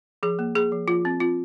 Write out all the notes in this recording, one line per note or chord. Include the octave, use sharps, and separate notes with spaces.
F3 G#4
A#3
A#3 G#4
F3
F3 F4
C4
C4 F4